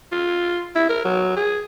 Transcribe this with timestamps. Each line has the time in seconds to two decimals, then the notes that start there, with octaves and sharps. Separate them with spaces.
0.12 F4
0.75 E4
0.89 A#4
1.05 F#3
1.36 G#4